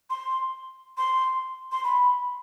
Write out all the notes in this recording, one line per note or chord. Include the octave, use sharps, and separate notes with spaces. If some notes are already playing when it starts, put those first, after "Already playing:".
C6
C6
C6
B5